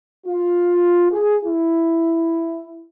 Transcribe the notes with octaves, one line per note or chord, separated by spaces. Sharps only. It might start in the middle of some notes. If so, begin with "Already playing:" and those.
F4
G#4
E4